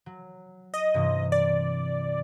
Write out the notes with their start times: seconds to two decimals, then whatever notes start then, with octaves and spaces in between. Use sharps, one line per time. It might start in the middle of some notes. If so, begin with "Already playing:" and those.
0.06 F#3
0.74 D#5
0.94 G2 C3 E3
1.32 D5